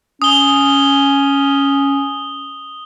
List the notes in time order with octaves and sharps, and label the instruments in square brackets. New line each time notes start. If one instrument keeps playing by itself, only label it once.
[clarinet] C#4 [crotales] D#6 G7